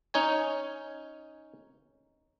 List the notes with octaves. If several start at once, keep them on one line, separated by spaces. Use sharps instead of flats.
C#4 D#4 C#5 G#5